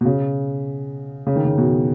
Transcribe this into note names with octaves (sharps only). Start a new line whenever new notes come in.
B2
C#3
C#3
D#3
C#3
B2